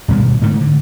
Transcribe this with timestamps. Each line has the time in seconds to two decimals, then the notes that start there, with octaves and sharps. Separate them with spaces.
0.08 G2 B2 D#3 G#3
0.42 G#2 D3 A3
0.61 D3